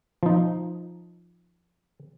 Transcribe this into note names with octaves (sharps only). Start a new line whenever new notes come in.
F3 D#4